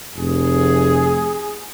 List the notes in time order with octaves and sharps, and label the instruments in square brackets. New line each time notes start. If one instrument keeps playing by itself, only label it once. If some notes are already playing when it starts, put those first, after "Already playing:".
[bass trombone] F1 [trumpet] G#4